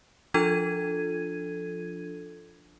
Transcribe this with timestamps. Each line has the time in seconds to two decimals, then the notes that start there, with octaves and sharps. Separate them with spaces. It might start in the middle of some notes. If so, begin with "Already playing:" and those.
0.34 F3 D4 F4 A4 G#6 D#7